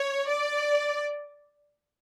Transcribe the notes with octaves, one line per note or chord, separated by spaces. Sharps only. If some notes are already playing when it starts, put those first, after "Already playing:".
Already playing: C#5
D5